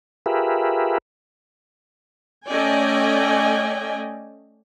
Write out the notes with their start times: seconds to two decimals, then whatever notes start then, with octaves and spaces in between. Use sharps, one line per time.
0.26 F4 G4 G#4 A#4 B4 E5
2.48 A3 C#4 D5 D#5 G5 G#5